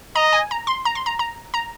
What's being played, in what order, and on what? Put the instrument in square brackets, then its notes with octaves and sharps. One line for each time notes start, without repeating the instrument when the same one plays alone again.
[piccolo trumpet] D#5 [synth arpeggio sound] A#5
[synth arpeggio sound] G#5
A#5
C6
A#5
C6
A#5
A#5
A#5